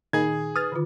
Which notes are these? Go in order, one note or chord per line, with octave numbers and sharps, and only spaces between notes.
A#2 D#3 D#4 G#4 G#6
B4 D#6 F6 A6
D3 D#3 F4